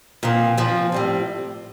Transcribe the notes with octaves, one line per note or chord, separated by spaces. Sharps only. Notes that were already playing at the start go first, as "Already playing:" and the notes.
A#2 F3 C4
A#2 F3 C4
A2 G3 C4